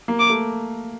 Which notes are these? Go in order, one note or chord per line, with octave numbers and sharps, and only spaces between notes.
A#3
D6
A3